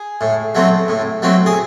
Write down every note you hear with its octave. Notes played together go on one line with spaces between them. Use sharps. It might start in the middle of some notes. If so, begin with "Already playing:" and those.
Already playing: G#4
A2
F#3 A3 C4
A2
F#3 A3 C4
G#4